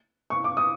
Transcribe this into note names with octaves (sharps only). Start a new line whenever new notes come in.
C#6
D6
D#6